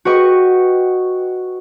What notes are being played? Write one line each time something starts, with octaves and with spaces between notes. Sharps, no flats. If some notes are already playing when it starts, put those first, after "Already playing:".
F#4 B4 D#5 G5 C#6